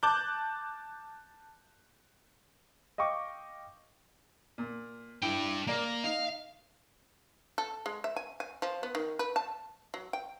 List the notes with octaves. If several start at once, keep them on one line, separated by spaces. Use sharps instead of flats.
A5 D6 F#6 G6
D#5 F5 G5 C#6 D6
A#2
D4 E4 G5
A#3 D5 A#5
D#4 F5
A4
G#3
E5
G#5
G#5
F3
B3
D#3
B4
A5
F#3
G5